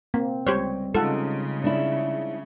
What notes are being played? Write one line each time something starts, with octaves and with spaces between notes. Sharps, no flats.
A#3 C4
C#2 G3 G4 C5 C#5
C#3 G#3 D#4 F4 A4 F#5
D4 E4